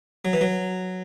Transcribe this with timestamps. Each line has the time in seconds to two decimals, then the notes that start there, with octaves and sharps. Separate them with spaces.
0.25 F#3
0.33 E3
0.41 F#3